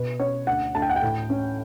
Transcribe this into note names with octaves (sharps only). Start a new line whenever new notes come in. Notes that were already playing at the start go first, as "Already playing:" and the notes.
Already playing: B2 B4
C#4 C#5
D2 F#5
D2 A5
G5
F#5
G5
A2
C#4